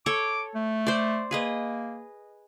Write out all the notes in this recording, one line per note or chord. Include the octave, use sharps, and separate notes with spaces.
A4 C#5 D6
A3
C5 D5
A#3 G#4 B4 D#5